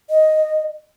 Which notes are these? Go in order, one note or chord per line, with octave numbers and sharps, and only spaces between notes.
D#5